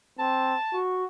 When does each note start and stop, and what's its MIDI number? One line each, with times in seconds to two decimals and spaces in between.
0.19 0.54 60
0.19 0.78 81
0.73 1.05 66